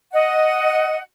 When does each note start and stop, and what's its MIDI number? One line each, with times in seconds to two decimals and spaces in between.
0.13 0.98 75
0.13 0.98 78